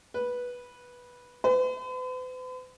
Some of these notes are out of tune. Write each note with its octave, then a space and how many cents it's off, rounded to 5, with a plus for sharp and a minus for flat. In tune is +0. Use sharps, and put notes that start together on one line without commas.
B4 -10
B4 +45